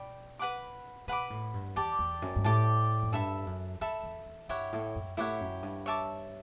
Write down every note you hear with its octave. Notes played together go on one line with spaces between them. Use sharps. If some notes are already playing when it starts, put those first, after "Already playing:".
Already playing: B2 D5 G5 B5
B4 F#5 B5 D6
B2 B4 F#5 B5 D6
A2
G2
E2 G4 D5 A5
E2
F#2
G2
A2 G4 D5 A5
F#2
G2 A4 E5 B5
F#2
F#2 A4 E5 B5
E2
E2
G2 E4 G4 C#5 F#5
A2
F#2
A2 E4 G4 C#5 F#5
F#2
G2
C#5 E5 A5 D6